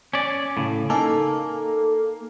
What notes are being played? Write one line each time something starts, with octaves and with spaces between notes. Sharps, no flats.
C#4 D5
A2 C#3
A#3 D#4 A4 G#5